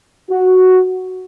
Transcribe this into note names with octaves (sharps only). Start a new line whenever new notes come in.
F#4